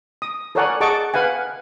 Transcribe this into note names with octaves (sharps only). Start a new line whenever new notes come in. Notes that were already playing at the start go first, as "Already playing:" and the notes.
D#6
A4 A#4 C#5 D5 F#5 G#5
G#4 D#5 F#5 A5 C#6 D6
B4 F5 F#5 G#5